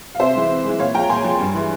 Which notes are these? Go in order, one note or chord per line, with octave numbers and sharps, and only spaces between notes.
F5
C3 C5 E5
E3 G#3
C3
E3 G#3
A#2 C#5 F5
F3 G#3 G5 A#5
A#2 G#5 C6
F3 G#3
G2
E3 G#3